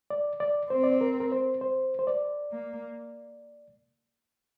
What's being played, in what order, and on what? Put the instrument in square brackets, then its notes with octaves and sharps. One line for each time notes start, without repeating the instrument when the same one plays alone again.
[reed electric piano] D5
D5
[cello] C4 [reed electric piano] C5
[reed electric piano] D5
C5
A#4
A#4
C5
C5
C5
D5
[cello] A#3